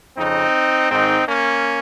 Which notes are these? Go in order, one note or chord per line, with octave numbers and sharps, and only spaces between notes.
F2 C#3 C4 D#4
G#2 D#3 C4 D#4
A#3 C#4